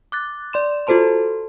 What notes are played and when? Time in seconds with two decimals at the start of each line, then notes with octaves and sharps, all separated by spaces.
0.12 D6 F#6 A6
0.53 D5 C6 E7
0.87 F4 F#4 A4 C5 A5 C6